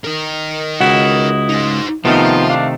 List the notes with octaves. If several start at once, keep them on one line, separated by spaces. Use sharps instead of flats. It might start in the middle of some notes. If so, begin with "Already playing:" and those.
D#4 A#4
C#2 E4 F#4 D#5 F#5
D#4 C5
C3 D#3 F3 A3 B3 D#4 F4
D4 F5